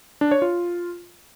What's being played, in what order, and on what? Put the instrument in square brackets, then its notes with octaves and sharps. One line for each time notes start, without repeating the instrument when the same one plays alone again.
[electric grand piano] D4
C#5
F4